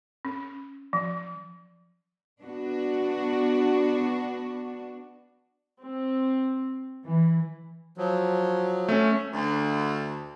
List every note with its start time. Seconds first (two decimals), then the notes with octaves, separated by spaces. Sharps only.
0.25 C#4
0.93 F3
2.42 B3 D4 F#4
5.81 C4
7.07 E3
7.98 F3 F#3
8.88 A3 C#4
9.33 D2